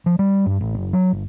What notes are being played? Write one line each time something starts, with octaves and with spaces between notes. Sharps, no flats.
F3
G3
G2
A1
F#1
F#3
G1